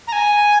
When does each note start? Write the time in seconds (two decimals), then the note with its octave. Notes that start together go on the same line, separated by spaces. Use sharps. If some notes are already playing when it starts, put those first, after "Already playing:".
0.07 A#5
0.12 G#5